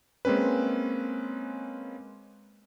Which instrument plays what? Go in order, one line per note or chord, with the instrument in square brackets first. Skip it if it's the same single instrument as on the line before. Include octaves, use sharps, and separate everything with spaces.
[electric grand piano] G#3 A#3 C4 C#4 B4